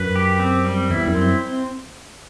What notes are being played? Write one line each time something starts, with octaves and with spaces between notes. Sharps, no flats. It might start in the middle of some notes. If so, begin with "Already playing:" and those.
Already playing: F#2 B4
G4
C4
G3
E2 E4
F#2
C4